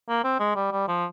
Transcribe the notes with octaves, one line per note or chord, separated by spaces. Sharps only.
A#3
C4
G#3
G3
G3
F3